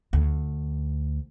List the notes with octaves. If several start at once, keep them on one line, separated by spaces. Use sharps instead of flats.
D2